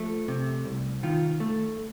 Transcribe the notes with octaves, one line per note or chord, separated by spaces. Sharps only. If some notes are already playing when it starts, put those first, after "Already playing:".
Already playing: F3 A3
C3
C2
D#3 F4
A3